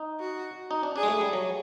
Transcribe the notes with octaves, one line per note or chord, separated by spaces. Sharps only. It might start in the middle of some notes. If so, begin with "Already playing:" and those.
Already playing: D#4
F#4
D#4
D4
D4 G#4
G#3
A3
G3
F#3